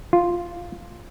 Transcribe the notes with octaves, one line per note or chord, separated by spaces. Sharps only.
F4